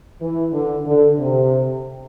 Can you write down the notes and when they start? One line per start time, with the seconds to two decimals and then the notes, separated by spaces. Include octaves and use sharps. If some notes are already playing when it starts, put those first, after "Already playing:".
0.21 E3
0.52 D3
0.85 D3
1.18 C3